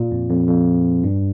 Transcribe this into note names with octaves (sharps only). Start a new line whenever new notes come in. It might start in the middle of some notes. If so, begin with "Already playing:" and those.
Already playing: A#2
F2
F2
F2
G2